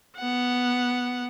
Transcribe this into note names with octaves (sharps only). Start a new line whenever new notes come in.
B3 F#5